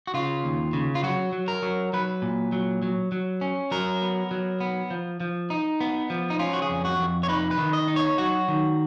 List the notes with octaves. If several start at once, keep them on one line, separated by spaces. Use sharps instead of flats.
F#4
C#3 F4
D#2
C#3
F4
F#3 F#4
F#3
A#4
F#3
F#3 B4
A#2
F#3
F#3
F#3
C#4
F#3 A#4
B3
F#3
B3
F3
F3
D#4
B3
F3
D#4
C#4 F4
F#4
G#4
F2
F#4
F2
C#5
D#4 B4
B4
D#3
D#5
D#4
C#5
F#3 F#4
D#3